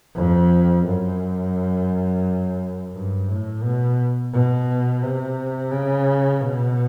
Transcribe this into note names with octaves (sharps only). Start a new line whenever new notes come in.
F2
F#2
G2
A2
B2
B2
C3
C#3
B2